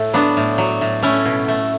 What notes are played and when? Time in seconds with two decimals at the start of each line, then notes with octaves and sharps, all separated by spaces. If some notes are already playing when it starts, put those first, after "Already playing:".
Already playing: A2 A3
0.13 F#3 B3 D4
0.37 A2
0.58 F#3
0.81 A2
1.02 A3 C#4 E4
1.25 B2
1.48 A3